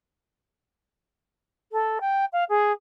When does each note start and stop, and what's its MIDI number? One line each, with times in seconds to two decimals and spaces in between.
1.72 1.98 69
2.01 2.25 79
2.32 2.44 77
2.49 2.72 68